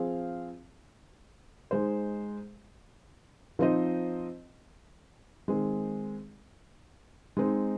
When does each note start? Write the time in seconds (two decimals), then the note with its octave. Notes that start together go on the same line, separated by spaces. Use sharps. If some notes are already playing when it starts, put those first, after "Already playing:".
Already playing: F3 C4 G#4 F5
1.71 G#3 D#4 C5
3.59 F3 C4 D#4 C5 D#5
5.48 D#3 G#3 C4
7.37 G#3 C4 D#4